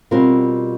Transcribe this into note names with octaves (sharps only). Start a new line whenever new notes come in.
B2 G3 C4 F4 A#4